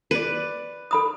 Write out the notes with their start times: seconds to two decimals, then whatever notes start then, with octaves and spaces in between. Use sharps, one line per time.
0.11 B4 D5
0.91 A4 B5 D#6